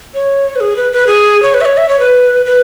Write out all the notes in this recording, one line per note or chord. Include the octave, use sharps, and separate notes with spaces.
C#5
B4
G#4
B4
B4
G#4
C#5
B4
E5
C#5
E5
C#5
B4
B4